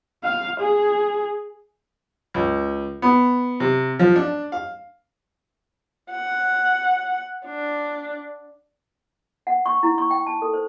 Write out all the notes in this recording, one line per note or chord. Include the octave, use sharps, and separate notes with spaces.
F5
G#4
C#2
B3
C3
F3
D4
F5
F#5
D4
F#5
C#6
E4
C#6
G5
A5
A4
C5